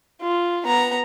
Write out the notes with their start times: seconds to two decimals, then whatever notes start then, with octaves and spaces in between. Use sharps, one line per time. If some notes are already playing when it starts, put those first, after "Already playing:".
0.23 F4
0.66 B3 A#5